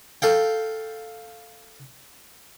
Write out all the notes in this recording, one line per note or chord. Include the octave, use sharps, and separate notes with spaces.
A4 F5 G5